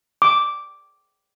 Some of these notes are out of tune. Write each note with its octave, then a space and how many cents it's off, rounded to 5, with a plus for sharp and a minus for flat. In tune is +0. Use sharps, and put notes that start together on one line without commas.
D6 -5